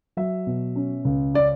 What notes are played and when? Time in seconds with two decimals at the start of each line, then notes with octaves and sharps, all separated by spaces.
0.17 F#3 E5
0.47 B2
0.76 C#4
1.05 C#2
1.34 C#4 D5